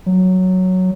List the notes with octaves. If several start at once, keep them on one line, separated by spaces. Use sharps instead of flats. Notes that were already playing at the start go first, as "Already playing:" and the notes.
F#3